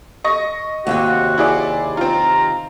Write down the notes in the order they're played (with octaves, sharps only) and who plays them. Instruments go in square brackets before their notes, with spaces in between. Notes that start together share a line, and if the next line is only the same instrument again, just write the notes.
[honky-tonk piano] D#5 C#6 A#6
[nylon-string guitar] D#2 C3 G5 [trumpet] F#4
[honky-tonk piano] E4 G#4 D5
[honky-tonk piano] C4 F4 [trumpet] A#5